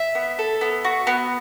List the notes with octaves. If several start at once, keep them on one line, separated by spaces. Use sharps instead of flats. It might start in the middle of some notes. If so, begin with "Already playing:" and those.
Already playing: E5
B3
A4
B3
F#4
B3